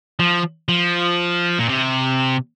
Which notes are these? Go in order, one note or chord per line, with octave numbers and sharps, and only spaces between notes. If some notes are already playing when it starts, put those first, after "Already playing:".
F3
F3
A#2
C3